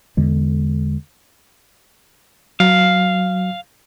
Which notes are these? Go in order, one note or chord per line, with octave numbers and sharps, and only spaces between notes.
E2 D3 G#3
F#3 F5